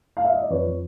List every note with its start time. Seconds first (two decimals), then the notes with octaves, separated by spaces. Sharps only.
0.17 F5
0.25 E5
0.33 D#5
0.42 D5
0.50 F2 B4 C#5
0.65 F3